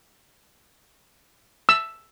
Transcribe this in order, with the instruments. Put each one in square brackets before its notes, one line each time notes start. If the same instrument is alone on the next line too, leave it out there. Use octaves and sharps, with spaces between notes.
[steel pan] E6